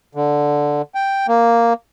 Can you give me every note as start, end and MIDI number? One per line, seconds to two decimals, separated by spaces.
0.15 0.82 50
0.95 1.27 79
1.28 1.73 58